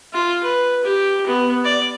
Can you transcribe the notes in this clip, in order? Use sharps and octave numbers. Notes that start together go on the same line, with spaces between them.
F4
B4
G4
B3
D5